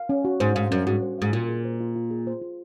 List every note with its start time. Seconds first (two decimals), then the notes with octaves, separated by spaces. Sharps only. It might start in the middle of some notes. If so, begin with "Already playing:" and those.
Already playing: F5
0.09 C#4
0.25 F#4
0.40 G#2 C5
0.55 G#2 F5
0.71 F#2 C#4
0.87 G#2 F#4
1.02 C5
1.18 G#2 F5
1.33 A#2 F4
1.49 G#4
1.65 C5
1.81 F4
1.96 F4
2.10 G#4
2.27 C5
2.42 F4